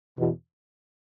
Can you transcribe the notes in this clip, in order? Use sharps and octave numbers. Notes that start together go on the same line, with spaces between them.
E2 B2